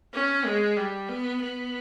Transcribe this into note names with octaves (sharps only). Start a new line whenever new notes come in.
C#4
G#3
G3
B3
B3